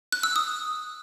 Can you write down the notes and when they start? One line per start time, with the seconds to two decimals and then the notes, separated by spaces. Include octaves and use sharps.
0.12 F#6
0.23 E6
0.36 D#6